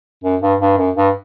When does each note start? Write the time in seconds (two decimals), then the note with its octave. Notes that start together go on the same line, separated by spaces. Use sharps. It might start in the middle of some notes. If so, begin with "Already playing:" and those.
0.24 F#2
0.42 G2
0.60 G2
0.78 F#2
0.97 G2